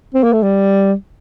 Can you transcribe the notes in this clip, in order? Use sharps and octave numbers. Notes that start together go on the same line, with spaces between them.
C4
A#3
A3
G3